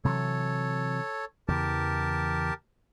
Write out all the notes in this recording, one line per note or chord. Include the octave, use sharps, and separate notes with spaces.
C3 E3 F#3 A4 C#5
E2 C#3 E3 G4 A#4 A5